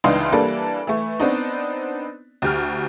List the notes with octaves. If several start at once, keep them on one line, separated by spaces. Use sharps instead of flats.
C#2 E3 D4 D#4 F5 C6
E3 G3 A#3 D4 A4
E3 A3
B3 C4 D4 D#4
D2 G4 F6